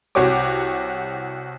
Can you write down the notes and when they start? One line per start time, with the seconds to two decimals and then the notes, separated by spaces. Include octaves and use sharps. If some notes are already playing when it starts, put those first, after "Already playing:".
0.15 C2 F#4 G4 C#5 D6